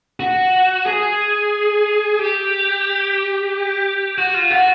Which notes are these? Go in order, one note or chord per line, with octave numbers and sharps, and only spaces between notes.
F#4
G#4
G4
F#4
F4
F#4